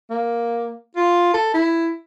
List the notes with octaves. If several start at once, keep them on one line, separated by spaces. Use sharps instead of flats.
A#3
F4
A4
E4